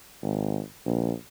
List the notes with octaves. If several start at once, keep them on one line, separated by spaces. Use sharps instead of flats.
G#1
A#1